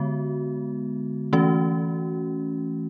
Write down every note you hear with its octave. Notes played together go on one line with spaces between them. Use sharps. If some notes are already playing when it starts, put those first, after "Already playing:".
Already playing: D3 G#3 B3 F#4
E3 A3 C#4 F#4